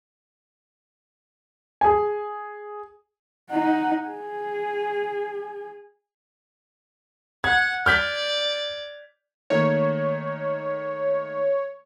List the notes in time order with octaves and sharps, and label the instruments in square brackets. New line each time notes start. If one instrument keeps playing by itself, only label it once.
[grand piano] G#4 G#5
[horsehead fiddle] D#4 F#5
G#4
[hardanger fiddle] F#5 [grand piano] G#6
[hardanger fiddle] D5 [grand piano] F6 G6 B6
[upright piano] D#3 A3 A#3 [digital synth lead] C#5